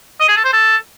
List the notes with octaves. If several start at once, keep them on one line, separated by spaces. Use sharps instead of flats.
D#5
G#4
A4
C5
A4